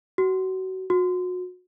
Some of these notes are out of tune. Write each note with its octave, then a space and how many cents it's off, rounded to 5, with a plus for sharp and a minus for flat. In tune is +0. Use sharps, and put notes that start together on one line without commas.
F#4 +30
F#4 -30